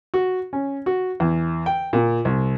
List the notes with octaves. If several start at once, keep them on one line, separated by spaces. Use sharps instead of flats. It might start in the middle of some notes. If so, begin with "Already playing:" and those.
F#4
C#4
F#4
E2
G5
A#2
C2